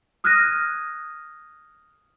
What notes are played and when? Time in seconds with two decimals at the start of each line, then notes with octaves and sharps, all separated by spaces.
0.24 D#6 F6 F#6 G#6 A#6 D#7